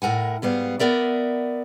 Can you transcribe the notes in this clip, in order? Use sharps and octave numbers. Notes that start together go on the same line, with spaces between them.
A2 A#4 F#5 G#5
G#2 G3 B3 F5
B3 A#4 D5 E5